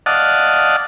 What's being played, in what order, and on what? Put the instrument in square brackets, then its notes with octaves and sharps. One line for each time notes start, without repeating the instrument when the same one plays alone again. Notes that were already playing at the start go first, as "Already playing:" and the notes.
[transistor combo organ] D5 D#5 F5 F#5 A5